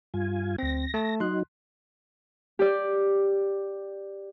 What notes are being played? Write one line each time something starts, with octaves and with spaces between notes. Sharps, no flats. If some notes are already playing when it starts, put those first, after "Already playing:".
G2 F4 G#5
D2 C4 A#6
A3 A5
F#3 D#4 C6 F#6
G4 D5